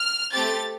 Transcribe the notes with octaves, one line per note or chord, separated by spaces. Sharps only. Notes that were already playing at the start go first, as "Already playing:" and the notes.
Already playing: F6
A3 C4 G4 A6